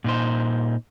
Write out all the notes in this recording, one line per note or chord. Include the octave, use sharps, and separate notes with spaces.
A#2 D#4 C5